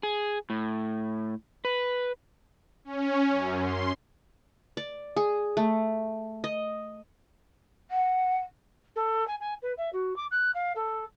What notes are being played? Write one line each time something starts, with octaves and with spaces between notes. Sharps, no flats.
G#4
A2
B4
C#4
F#2
C6
D5
G#4
A3
D#5
F#5
A4
G#5
G#5
B4
E5
F#4
D6
F#6
F5
A4